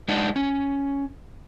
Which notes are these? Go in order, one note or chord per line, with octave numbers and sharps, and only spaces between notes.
G#3 D4 D#4 F#5
C#4